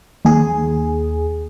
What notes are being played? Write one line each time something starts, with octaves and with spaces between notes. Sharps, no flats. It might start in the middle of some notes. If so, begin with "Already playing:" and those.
D#2 G#4